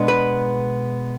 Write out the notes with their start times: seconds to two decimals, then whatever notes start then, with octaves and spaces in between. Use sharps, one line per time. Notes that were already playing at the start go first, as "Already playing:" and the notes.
Already playing: B2 G#3 B3 D4
0.08 B4